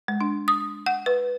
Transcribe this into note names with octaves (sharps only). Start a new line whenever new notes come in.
G#3
D4
D#6
F#5
B4